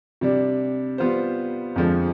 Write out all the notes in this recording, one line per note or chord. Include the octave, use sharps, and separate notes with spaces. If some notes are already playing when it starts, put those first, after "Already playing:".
C3 G3 D4
G3 B3 F4 C5
F2 D3 F3 G#3